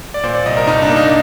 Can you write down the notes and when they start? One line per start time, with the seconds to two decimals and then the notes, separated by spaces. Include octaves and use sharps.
0.14 D5
0.23 A#2 C5
0.35 D5
0.46 C2 D#5
0.57 A#4
0.67 G2 D#4
0.82 D4
0.89 A#3
0.97 D#4